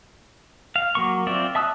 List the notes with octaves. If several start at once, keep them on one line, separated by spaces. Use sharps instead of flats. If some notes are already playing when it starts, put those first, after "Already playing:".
F5
F#3 A#3 C#6
C4 F4 D5 E5
E5 A5 D#6 E6 F#6